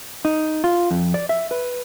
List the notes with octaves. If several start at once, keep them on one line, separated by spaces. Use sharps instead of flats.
D#4
F4
F2
D5
E5
B4